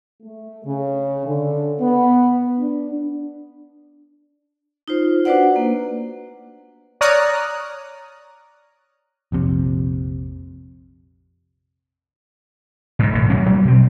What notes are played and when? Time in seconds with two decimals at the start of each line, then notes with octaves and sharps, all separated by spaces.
0.22 A3
0.65 C#3
1.25 D3
1.80 B3
2.59 D4
4.88 D#4 F4 C5
5.25 D4 F#4 B4 C5 D5 F#5
5.56 A#3
7.01 C#5 D5 A#5 D#6 F6 F#6
9.32 A#1 F2 C3
12.99 G#2 B2
13.12 E1 A2
13.30 D2 F#3 A#3 C#4
13.46 A#2 F#3 G3 A#3
13.65 B2 C4